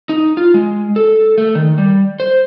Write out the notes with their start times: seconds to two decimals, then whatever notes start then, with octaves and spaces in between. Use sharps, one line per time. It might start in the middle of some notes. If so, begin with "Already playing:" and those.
0.09 D#4
0.37 F4
0.54 G#3
0.96 A4
1.38 A3
1.55 D#3
1.78 G3
2.20 C5